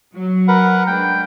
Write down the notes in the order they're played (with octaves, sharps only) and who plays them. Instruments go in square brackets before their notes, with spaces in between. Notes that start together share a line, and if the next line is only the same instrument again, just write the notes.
[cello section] F#3
[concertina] A#4 B4 F#5
[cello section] G#3 D4 [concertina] G5